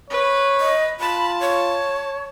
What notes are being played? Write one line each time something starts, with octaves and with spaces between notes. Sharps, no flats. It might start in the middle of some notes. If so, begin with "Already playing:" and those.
B4 C#5
D#5
F4 A5 B5
C#5